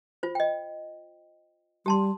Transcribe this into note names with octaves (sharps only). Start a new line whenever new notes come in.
F4 C5
D#5 G5
G3 G4 A5 C6